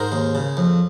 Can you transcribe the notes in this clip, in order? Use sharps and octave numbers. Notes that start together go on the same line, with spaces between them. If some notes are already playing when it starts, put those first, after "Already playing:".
Already playing: G#2 A#4 C5
D#2
C#3
F2